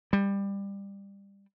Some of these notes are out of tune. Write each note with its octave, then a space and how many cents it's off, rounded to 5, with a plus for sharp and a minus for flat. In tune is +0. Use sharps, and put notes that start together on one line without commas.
G3 +20